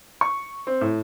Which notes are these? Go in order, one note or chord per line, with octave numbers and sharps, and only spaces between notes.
C#6
C4
A2